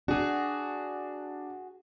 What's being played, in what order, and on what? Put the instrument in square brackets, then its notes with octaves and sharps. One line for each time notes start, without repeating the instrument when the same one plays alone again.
[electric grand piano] D4 [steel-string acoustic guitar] F#4 G#4